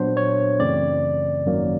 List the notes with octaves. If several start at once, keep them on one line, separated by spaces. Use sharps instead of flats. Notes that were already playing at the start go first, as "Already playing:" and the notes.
Already playing: A#2 F#3 B3 D4 C5
C#5
F#2 C#3 E3 A3 C4 D5
G#1 F#2 D#3 F#3 A#3